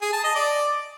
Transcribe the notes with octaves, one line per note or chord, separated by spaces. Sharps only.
G#4
A5
D#5
D5